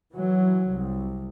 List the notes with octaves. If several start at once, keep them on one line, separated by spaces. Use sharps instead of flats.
E3 F#3
C2